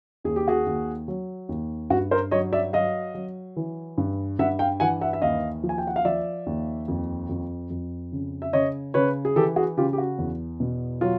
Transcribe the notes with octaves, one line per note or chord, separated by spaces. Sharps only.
D#2 G#4
G4
F#4 G#4
D#2
F#3
D#2
G2 F#4
A#4 C5
F#3 C#5 D#5
D5 E5
F#3 D#5 F5
F#3
E3
G2
G2 E5 F#5
F5 G5
E3 F#5 G#5
E5 F#5
E5
D#2 D#5 F5
F3
G#5
G5
F#5
F5
F3 D5 E5
D#2
F2
F2
F2
C#3
E5
C#3 C#5 D#5
C#3 B4 C#5
G#4
E3 G4 A4
F#4 G#4
C#3 F4 G4
G4
F#4
E2
B2
F#3 F4